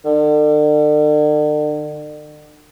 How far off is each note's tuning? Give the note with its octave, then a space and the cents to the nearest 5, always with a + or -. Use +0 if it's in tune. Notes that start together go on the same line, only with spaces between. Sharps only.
D3 +40